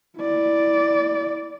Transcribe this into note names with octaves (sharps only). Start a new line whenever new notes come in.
E4 D5